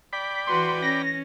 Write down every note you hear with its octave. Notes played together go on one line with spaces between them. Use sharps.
D5 G5 B5 B6
E3 F#4 B4 C6
C#4 A#6